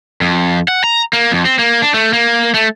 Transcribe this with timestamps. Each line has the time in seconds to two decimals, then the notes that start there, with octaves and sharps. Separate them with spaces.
0.21 F2
0.68 F#5
0.84 A#5
1.13 A#3
1.31 F2
1.45 C4
1.59 A#3
1.82 D4
1.94 A3
2.13 A#3
2.54 A3